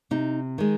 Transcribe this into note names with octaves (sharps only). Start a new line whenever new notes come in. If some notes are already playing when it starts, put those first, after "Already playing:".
C3 D#4
D#3 G#3